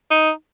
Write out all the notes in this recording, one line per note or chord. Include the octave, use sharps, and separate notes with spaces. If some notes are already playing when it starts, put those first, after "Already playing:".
D#4